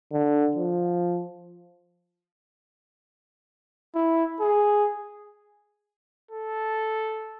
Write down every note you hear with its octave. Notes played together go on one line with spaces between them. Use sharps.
D3
F3
E4
G#4
A4